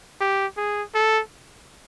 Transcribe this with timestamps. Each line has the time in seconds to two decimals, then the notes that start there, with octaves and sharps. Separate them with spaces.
0.21 G4
0.57 G#4
0.95 A4